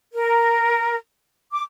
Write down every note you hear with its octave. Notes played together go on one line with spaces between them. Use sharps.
A#4
D6